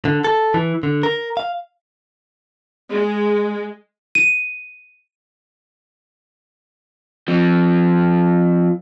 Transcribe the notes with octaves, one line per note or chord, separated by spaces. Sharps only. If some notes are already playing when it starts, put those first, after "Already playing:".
D3
A4
E3
D3
A#4
F5
G#3
D#7
F3 C4